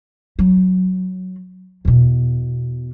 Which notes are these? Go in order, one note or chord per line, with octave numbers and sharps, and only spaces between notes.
F#3
E2 B2